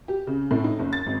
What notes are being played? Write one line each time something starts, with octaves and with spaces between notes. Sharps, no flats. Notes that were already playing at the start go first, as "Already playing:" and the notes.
G4
C#3
A2
D#4
F#1
A6
G#1